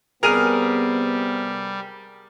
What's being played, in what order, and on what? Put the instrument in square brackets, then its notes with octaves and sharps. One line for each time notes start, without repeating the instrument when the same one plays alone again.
[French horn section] C3 B3 [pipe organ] G3 [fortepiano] G#4 A#4 [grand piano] F6 D#7 F7